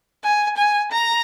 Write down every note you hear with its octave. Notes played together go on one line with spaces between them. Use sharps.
G#5
G#5
A#5